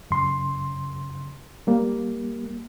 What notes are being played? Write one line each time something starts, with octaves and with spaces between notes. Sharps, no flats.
F#2 C#3 C6
G3 A#3